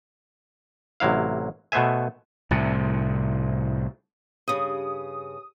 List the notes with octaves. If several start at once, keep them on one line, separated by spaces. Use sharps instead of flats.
A1 C3 F#3 E4 F5
B2 A3 B3 C5 E5 G#5
C2 A2 C3
G2 C#3 D#6